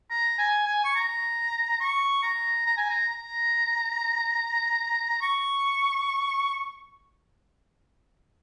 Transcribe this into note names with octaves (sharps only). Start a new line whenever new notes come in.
A#5
G#5
G#5
C#6
A#5
C#6
A#5
A#5
G#5
A#5
A#5
C#6